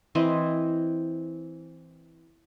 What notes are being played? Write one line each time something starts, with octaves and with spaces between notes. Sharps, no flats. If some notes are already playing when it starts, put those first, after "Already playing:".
E3 C4 C5 D#5